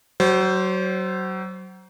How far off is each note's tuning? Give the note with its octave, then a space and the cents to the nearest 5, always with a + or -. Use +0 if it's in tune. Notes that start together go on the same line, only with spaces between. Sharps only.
F#3 +25 C5 +0